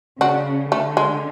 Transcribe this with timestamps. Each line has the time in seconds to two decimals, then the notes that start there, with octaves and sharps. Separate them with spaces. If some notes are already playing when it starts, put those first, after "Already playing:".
0.21 C#3 D4 F#4
0.72 D3 A3
0.97 G#3